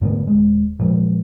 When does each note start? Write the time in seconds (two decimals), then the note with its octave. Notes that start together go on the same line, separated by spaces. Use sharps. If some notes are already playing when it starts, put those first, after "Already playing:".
0.01 G#2 D3 A3 B3
0.27 D#1 G#3
0.79 A#2 F3 F#3 G#3